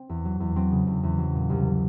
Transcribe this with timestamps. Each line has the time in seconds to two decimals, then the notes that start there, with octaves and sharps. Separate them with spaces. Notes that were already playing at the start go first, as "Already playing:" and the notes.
Already playing: C4
0.09 E2
0.25 F#3
0.40 E2
0.56 F#3 C4
0.72 C#3
0.87 E2
1.03 E2
1.19 F#3
1.35 A#2
1.50 C2